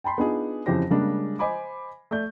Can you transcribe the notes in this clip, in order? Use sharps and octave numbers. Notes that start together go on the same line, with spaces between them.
G5 A5 B5 C6
B3 D4 D#4 F4 G#4
F2 C#3 E3 G4 C5 A#6
C#3 G3 G#3 A#3 D4
C5 D#5 G#5 B5 D6
A3 D5 G6